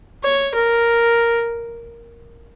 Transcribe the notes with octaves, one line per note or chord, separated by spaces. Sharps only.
C#5
A#4